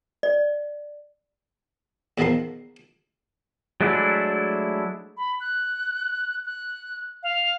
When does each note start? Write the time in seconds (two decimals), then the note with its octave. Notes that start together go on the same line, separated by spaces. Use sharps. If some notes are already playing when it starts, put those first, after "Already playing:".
0.23 D5
2.18 E2 B2 D#3 F3 A#4 C6
3.81 F#3 G#3 A3 D4 E4
5.17 B5
5.40 F#6
6.45 F#6
7.23 F5